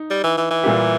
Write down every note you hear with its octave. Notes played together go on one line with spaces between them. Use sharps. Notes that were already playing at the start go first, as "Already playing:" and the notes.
Already playing: D#4
G3
E3
E3
E3
A#2 G3 A#3 E4 G4